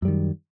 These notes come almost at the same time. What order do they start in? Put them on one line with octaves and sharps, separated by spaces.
F#2 G3 D#3